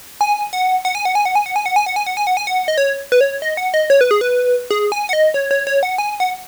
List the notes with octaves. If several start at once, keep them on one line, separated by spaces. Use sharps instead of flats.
G#5
F#5
F#5
G#5
F#5
G#5
F#5
G#5
F#5
G#5
F#5
G#5
F#5
G#5
F#5
G#5
F#5
G#5
F#5
D#5
C#5
B4
C#5
D#5
F#5
D#5
C#5
B4
G#4
B4
G#4
G#5
F#5
D#5
C#5
C#5
C#5
F#5
G#5
F#5